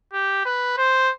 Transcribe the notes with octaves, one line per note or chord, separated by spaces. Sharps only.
G4
B4
C5